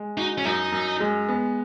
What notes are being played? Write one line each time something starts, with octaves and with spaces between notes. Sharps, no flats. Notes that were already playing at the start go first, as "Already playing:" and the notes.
Already playing: G#3
D#4 F#4
C#4
F#2 D#4
F#2
G#3
B3